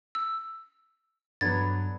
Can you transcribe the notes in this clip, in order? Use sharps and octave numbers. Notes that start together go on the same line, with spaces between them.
E6
G2 D3 F#3 B3 D4 G#6 A6